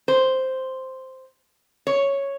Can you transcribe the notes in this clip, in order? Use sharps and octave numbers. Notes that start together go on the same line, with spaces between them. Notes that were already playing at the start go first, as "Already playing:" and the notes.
C5
C#5